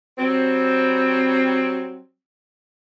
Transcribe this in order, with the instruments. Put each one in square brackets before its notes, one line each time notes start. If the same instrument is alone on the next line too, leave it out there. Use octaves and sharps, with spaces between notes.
[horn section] F#3 G3 C4